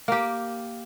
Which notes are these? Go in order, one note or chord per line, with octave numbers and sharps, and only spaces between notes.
A#3 G4